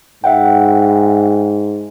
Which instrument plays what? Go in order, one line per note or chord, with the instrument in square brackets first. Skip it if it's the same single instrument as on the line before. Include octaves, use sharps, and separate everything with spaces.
[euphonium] G#2 [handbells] E5 F#5 G5